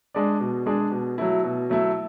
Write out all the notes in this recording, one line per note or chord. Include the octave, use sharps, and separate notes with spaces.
G#3 D4 G#4 D5
B2
G#3 D4 G#4 D5
B2
F#3 A3 E4
B2
F#3 A3 E4